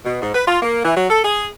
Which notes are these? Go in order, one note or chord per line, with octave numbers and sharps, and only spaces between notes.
B2
G#2
B4
F4
A#3
E3
F#3
A4
G#4